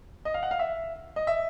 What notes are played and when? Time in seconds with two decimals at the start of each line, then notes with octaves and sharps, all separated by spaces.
0.25 D#5
0.34 F5
0.43 F#5
0.51 F5
0.59 E5
1.16 D#5
1.27 E5